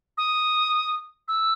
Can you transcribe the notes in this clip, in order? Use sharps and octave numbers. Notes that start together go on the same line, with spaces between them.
D#6
E6